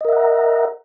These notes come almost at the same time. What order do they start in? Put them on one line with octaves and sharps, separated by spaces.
D#5 A#4 E5 F#5 A#5